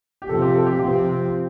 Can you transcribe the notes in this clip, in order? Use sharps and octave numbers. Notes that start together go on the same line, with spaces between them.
G4
F2 C3 F3 C4 A4
G4
A4
G4
C3 F3 C4 G4